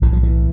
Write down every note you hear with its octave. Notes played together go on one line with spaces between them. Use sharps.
B1 A2 E3
F3
E3